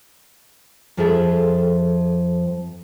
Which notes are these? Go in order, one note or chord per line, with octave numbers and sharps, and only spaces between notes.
F2 F3 F4 G#4 A4 E5